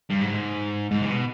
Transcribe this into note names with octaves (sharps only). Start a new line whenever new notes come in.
G2
G#2
G#2
C3
B2